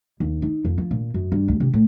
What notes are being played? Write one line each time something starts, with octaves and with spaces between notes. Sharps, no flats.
D#2
D#4
F2
F3
A#2
F#2
G2
D2
C3
A2